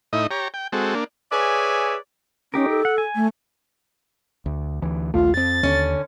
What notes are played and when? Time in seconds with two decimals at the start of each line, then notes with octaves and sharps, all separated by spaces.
0.13 A2 D#4 E4 D#5
0.31 G4 C#5 A#5
0.54 G5
0.72 G#3 C4 F#4 A4
0.95 A#3 D4
1.32 G#4 B4 C#5 D5 E5 G#5
2.54 C#4 D#4 G4 A#4
2.69 A4
2.85 F#5
2.98 G#5
3.15 A3
4.46 D2
4.82 D2 E3
5.14 A#1 D#2 A3 F4
5.34 F2 C4 A6
5.63 D#2 D3 C#4